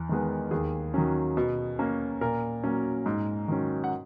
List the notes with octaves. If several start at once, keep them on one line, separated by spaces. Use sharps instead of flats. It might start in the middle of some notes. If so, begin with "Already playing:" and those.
Already playing: E2
D#3 G#3 B3
D#2 G#4
D#3 F#3 C#4
B2
A#3 C#4
A#2 A#4
F#3 A#3 C#4
G#2
D#3 F#3 C#4
F#5